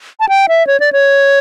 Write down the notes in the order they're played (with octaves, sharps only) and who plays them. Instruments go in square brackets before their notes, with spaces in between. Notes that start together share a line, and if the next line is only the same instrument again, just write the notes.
[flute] A5
G5
E5
C#5
D5
C#5